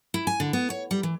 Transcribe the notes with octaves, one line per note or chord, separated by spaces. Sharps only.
E4
G#5
D3
B3
C#5
G3
E3